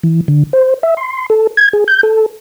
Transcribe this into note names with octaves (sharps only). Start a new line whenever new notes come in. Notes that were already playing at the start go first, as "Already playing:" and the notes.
E3
D3
C5
E5
C6
A4
G#6
G#4
G6
A4